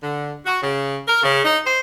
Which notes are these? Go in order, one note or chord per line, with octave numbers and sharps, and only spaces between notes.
D3
F#4
C#3
A#4
C#3
D#4
C5